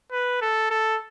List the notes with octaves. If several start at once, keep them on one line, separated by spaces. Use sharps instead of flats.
B4
A4
A4